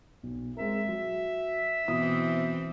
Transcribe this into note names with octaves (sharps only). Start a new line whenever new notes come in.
B1
G#3 C4 A#4 E5
F#3
B2 E3 C4 E4 D#6